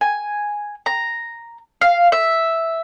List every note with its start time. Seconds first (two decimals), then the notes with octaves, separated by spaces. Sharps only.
0.01 G#5
0.86 A#5
1.81 F5
2.12 E5